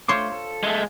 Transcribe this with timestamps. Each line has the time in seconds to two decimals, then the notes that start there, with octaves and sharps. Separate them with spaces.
0.08 A3 F4 C5 C#5 C6 D6
0.32 A4
0.63 G#3 A3